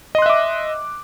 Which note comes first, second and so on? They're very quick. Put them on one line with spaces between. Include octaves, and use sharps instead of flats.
D#5 C6 F#6 E5 D6